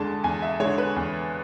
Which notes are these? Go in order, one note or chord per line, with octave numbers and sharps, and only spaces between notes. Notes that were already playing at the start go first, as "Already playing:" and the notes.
Already playing: E2 D3 G#3 A5
E2 G#5
E5
D3 G#3 C#5
B4
E2